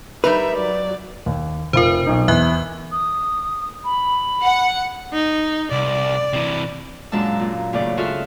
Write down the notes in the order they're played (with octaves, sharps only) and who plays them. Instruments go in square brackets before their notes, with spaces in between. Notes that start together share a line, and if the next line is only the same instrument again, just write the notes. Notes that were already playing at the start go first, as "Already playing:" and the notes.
[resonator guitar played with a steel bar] G3 D#4 A#4 [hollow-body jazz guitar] B4 [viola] E5
[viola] F#3 D5
[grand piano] D#2
[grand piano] F1 F4 [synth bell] A#4 C5
[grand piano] B1 D#4
[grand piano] E2 [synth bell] E5 F#6
[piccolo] D#6
B5
[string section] F#5
[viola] D#4
[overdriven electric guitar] C2 [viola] D5
[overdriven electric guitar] C3 E3
[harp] F#2 A#2 G#3 D4 A5 E6
A#2
D#2 A2 C#3 D5
F4 F#4 G#4 A4 E5 F6